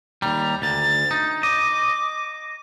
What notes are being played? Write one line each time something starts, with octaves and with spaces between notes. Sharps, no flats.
D#2 G3 A#5
D2 A6
D#4
D#5 D6